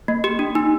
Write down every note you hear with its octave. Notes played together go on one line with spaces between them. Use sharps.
A#3
G4
D4
D#4